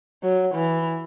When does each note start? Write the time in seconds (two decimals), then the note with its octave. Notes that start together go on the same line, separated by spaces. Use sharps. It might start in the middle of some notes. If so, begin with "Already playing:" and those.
0.23 F#3
0.54 E3